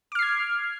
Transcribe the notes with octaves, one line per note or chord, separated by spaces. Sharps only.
D6 F6 G#6 C7